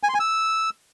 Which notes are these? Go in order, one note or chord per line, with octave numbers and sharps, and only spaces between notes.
G#5
C6
G#5
E6